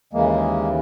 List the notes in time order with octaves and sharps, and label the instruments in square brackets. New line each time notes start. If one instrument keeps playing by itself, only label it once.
[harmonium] D#2 C#3 E3 G#3 A#3